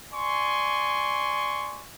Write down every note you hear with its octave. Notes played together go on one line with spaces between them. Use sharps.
D5 G#5 C6 C#6